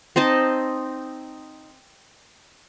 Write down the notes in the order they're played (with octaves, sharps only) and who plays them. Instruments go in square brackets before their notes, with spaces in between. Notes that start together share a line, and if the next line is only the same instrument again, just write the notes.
[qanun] C4 D#4 D#5 A5